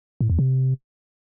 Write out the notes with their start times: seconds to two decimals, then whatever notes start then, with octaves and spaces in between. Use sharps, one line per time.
0.21 A2
0.30 E2
0.39 C3